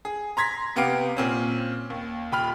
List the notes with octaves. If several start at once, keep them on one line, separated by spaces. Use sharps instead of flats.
G#4
A#5 C6 G#6 A#6 B6
C3 B3 G4 F5 D7
A#2 C4 C#4
D#2
D#1 G5 B5 F6